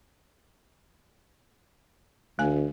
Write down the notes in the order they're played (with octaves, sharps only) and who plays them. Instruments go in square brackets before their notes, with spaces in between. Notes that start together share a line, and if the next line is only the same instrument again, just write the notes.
[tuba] D2 [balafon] A3 G#5